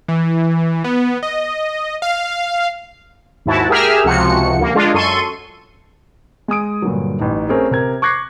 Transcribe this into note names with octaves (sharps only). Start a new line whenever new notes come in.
E3
B3
D#5
F5
D#2 G#2 E4 F#4 A5
G4 G#4 A#4 E5 E6 F6
C#2 C3 F3 F#4 C#7
D2 A#3
G#3 D4 F4
F#2 A4 C6 C#6 D#7
G#3 G#5 D#6 D7
G2 A#2 D3 F#3
A1 D#4
A3 C4 C#4 G#4 A#4
C3 A#4 G#6
C#6 D6 F#6 G#6 A#6 C7